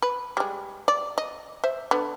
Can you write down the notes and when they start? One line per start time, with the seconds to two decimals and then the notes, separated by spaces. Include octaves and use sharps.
0.02 B4
0.37 G3 G#3
0.88 D5
1.18 D#5
1.64 C5 E5
1.91 D3 B3